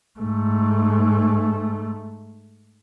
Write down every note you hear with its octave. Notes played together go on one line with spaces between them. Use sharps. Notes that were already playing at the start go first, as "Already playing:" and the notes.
G#2 A3